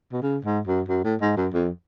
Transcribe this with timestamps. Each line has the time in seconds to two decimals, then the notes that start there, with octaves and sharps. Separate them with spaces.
0.12 B2
0.23 C#3
0.45 G#2
0.67 F#2
0.88 F#2
1.04 A2
1.21 G#2
1.37 F#2
1.53 F2